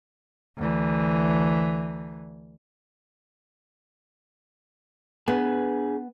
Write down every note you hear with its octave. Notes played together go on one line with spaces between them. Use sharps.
D2 E3
B3 D4 G#4 G#5